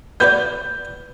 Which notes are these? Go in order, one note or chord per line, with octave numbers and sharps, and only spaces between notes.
B3 F#4 B4 D5 G6